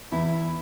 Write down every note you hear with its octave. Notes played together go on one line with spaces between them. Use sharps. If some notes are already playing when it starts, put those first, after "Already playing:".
E2 E4